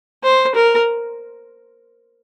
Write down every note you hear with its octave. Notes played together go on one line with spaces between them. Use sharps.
C5
A#4